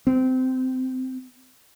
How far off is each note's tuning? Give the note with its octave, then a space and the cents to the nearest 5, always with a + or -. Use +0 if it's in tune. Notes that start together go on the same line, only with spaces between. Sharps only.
C4 -20